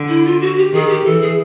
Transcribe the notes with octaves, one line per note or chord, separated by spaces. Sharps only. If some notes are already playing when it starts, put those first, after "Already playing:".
Already playing: D3
E4
F4
F#4
G4
D#3 G#4
G4
E3 A4
G#4